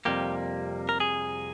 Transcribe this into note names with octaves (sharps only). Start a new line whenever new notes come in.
F2 C3 G3 A#3 G4
A#4
G#4